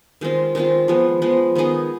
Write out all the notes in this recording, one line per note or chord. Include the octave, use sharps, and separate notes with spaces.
D#3 G#3 C4 F4
D#3 G#3 C4 F4
F3 G#3 B3
F3 G#3 B3
D#3 B3 D#4 G#4